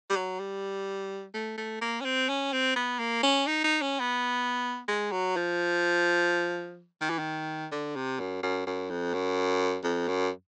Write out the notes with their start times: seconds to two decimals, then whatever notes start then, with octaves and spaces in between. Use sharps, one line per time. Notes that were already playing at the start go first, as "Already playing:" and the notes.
0.10 G3
0.16 F#3
0.40 G3
1.34 A3
1.58 A3
1.81 A#3
2.01 C#4
2.05 C4
2.29 C#4
2.52 C4
2.76 B3
2.99 A#3
3.23 C#4
3.47 D#4
3.64 D#4
3.82 C#4
3.99 B3
4.88 G#3
5.12 F#3
5.36 F3
7.01 D#3
7.10 E3
7.19 D#3
7.72 D3
7.96 C3
8.19 F#2
8.43 F#2
8.66 F#2
8.90 F2
9.14 F#2
9.84 F2
10.08 F#2